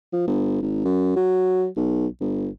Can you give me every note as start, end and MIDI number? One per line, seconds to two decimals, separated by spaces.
0.13 0.26 53
0.27 0.59 31
0.62 0.80 32
0.85 1.13 42
1.16 1.66 54
1.76 2.06 35
2.20 2.48 31